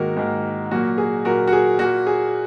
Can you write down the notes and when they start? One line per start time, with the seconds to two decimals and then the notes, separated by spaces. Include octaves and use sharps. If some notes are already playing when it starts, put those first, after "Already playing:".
Already playing: G#2 D#3 A#3 F#4 A#4
0.17 G#2 D#3 A#3
0.71 A#2 F#3 A#3 F#4
0.98 G#4
1.25 A#2 F#3 A#3 F#4 A#4
1.47 F#4
1.53 G#4
1.79 A#2 A#3 F#4
2.07 G#4